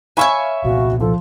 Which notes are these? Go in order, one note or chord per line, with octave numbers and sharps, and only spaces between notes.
C#5 E5 F5 G#5 B5 C#6
C2 A#2 B3 F#4
F3 A4